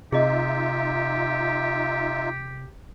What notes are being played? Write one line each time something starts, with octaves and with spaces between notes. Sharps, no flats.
C3 D#4 F4 G4 G#4 D#5 E5